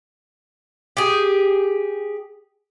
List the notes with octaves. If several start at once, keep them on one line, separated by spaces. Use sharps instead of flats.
G4 G#4